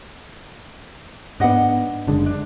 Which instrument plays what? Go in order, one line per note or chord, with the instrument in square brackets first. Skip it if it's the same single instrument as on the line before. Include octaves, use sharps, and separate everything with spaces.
[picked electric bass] G#2 B3 [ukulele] D4 D#5 F#5
[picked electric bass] F#1 D3 G#3
[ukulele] D4